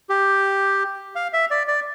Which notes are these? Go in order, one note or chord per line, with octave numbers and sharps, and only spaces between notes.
G4
F5
E5
D5
D5